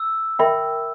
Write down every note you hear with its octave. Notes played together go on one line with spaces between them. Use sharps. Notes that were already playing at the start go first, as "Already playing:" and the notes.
Already playing: E6
A#4 E5 G5 B5